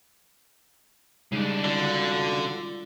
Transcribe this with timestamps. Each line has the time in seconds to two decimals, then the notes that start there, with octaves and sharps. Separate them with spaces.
1.32 C#3 G3 G#3 D4 D#4
1.64 D3 F4 F#4